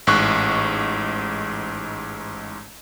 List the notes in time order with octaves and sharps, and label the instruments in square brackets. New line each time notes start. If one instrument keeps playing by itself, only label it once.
[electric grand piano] A1 G#2 C#6 F#6